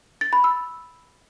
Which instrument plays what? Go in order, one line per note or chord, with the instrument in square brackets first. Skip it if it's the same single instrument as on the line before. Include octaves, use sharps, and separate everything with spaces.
[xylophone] A6
B5
E6